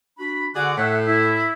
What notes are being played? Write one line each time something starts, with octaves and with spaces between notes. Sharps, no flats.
D4 F#4 B5
D3 F#4 G#4 D5
A2 E5 F#5
E4